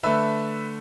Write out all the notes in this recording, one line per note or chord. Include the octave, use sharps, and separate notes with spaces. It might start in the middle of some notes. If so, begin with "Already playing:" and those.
D3 A3 B4 E5